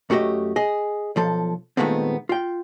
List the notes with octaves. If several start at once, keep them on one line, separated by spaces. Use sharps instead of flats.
F#2 A3 F#4 G4 D#5
G#4 D#5
B1 F3 A4
A#2 D#3 G#3 A3 B3 C4
F4 G5